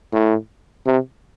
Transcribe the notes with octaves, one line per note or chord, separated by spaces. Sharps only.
A2
C3